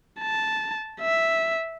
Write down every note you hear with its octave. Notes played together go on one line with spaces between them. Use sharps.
A5
E5